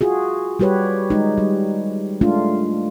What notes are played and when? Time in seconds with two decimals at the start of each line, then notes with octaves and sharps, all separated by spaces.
0.01 F4 F#4 G#4
0.59 G3 F#4 G4 B4 C#5
1.10 G#3 D#4
1.38 G3
2.21 G#3 A3 D4 F4